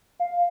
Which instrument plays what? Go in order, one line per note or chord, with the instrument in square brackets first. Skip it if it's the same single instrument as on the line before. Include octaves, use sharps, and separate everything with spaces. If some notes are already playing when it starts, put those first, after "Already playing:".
[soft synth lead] F5